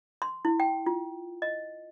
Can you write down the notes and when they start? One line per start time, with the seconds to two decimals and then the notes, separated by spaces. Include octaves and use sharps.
0.22 C6
0.45 E4
0.60 G5
0.86 F4
1.42 D#5